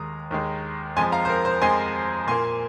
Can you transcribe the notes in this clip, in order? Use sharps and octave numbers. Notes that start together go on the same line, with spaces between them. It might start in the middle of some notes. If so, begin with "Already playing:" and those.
Already playing: D#2 D#3 G#3 A#5 D#6
D#2 D#3 G#3
F2 F3 G#3 G#5 C6
F5 A#5
C5
A#4
C5
F2 F3 G#3 G#5 C6
A#2 A#3 G#5 C6